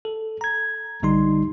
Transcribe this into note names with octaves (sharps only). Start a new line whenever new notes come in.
A4
A#5 G#6
A#1 D3 G3 D#4 C6